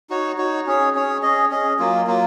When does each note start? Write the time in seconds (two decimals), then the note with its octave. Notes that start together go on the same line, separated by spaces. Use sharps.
0.10 D#4 F#4 C#5
0.38 D#4 F#4 C#5
0.67 C#4 G#4 C#5
0.95 C#4 G#4 C#5
1.22 C#4 G#4 D#5
1.51 C#4 G#4 D#5
1.79 F#3 A#3 F4
2.07 F#3 A#3 F4